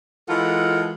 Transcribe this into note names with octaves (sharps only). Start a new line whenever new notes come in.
E3 G#3 F4 A4 A#4 F#5